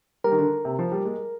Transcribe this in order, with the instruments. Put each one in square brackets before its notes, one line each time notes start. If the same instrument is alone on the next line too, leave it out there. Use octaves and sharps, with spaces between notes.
[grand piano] G3 [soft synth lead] A#4
[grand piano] D#3
D3
C3
F3
G3
G#3